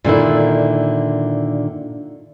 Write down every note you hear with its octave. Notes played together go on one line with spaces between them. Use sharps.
A#2 D3 D#3 E4